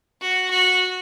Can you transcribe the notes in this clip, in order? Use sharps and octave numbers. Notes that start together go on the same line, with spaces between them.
F#4
F#4